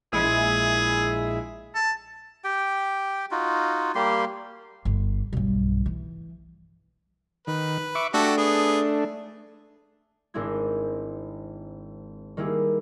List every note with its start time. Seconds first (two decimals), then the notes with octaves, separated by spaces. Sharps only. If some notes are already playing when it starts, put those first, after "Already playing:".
0.13 A#1 G#3 E4 G#4
1.75 A5
2.44 G4 G5
3.31 D#4 F4 F#4
3.95 G3 A#3 G4 C6
4.85 G1
5.33 B1 G2
5.86 E3
7.47 D#3 B4
7.95 E5 C#6 D6
8.14 A3 D4 F#4 G4 A4
8.37 B3 G#4
10.34 G#1 G#3 C4 D4 E4 G#6
12.37 D#3 G3 A#3 E4 G#4